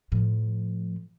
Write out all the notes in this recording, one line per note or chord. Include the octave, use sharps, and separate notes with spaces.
A2 F3